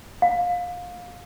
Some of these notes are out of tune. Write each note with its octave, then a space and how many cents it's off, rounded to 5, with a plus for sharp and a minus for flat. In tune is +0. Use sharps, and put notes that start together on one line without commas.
F5 +25